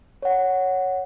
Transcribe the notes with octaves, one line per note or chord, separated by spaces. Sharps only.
C#5 F#5